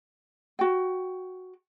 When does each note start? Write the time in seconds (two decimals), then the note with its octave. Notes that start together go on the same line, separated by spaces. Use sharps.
0.59 F#4 G5